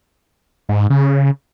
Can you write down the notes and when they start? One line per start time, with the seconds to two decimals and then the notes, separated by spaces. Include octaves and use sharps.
0.69 G#2
0.90 C#3